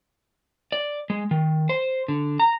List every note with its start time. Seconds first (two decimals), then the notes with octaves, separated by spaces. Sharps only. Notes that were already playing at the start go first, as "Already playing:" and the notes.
0.72 D5
1.10 G#3
1.31 D#3
1.69 C5
2.08 D3
2.40 A#5